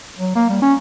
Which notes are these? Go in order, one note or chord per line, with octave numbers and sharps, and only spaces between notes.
F#3
A#3
G3
C#4